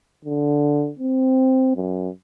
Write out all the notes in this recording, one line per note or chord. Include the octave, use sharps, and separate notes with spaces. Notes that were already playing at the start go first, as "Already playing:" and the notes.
D3
C4
F#2